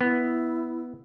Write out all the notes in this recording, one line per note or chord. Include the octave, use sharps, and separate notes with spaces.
B3 E4